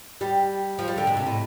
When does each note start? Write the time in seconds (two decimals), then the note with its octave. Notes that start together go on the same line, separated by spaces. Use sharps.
0.21 G3
0.79 F3
0.88 G3
0.98 D3
1.07 B2
1.17 C3
1.26 A2